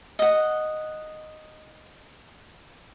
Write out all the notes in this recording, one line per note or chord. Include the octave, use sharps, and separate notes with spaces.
D#5 F#5